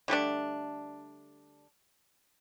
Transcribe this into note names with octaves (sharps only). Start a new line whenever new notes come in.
D3 G3 A3 D4